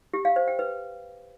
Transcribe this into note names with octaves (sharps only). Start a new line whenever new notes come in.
G4
F5
C5
G5
B4